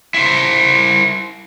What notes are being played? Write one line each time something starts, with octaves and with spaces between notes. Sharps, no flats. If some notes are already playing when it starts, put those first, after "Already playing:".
E4 C5